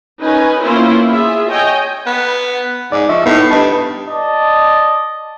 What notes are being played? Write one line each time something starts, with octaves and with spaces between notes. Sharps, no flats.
C#4 D#4 B4 G#5
A#3 B3 C#4 E4 F4 C5
F4 G#4 E5
C#5 D#5 G5 G#5
B3
G#2 D5
F3 D#5 E5 C#6
A2 B3 D#4
G2 B4 D#5 A5
D5 D#5 A5